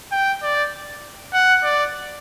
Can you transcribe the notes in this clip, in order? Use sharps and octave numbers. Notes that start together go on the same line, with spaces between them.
G5
D5
F#5
D5